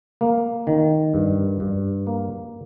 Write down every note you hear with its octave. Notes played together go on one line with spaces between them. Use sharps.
A#3
D#3
G2
G2
A#3